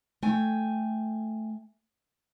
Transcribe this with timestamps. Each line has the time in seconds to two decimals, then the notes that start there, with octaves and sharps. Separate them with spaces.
0.23 A3 G5 G#5